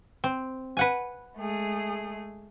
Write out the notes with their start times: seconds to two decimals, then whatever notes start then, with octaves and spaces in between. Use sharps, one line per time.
0.24 C4
0.77 B4 F#5 G#5
1.37 G#3 A3 G#4